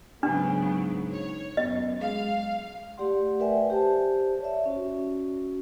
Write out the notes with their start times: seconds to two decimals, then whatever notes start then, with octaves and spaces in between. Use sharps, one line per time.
0.23 G#2 C#3 F#3 B3 D4
1.12 C#5
1.57 F#2 B3 D#5
2.00 G#3 F5
2.98 A3 G4 D5 F#5 C6
3.40 A#4 B4 D5 E5 G5 G#5
3.70 G4 C5 A5
4.40 C#5 D5 E5
4.66 C#4 F#4